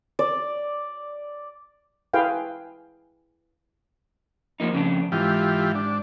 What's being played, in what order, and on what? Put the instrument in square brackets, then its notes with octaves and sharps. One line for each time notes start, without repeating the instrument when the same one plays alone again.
[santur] D5
[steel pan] E4 G#4 B4 F5 G5
[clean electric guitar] F3 A#3 D#4
F2 C#3 D4
[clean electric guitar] G#2 [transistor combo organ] E3 F4 G4
[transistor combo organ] D4